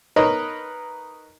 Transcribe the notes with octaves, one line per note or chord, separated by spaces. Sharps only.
D#4 A#4 B4 C#5 D#5